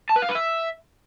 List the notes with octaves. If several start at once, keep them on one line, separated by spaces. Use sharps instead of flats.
A5
B4
F5
B4
E5